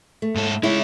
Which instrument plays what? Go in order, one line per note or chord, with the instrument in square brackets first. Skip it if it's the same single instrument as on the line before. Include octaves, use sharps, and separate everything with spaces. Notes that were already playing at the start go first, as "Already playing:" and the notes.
[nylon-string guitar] A3
[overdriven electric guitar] G#2 A4
[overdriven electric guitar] G#3 C#5 [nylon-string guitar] E4